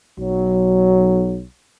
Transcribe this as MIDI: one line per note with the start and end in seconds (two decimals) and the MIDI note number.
0.20 1.44 35
0.20 1.44 54